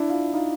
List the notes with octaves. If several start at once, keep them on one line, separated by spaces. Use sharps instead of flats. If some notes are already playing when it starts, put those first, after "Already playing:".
Already playing: D4 E4
F4
D#4 F4